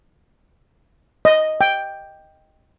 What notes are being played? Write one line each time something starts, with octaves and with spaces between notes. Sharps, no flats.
D#5
G5